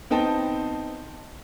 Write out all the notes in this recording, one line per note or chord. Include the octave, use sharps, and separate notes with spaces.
B3 C4 D#4 G5 A5